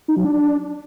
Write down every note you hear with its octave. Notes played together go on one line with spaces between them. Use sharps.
D#4
F#3
D4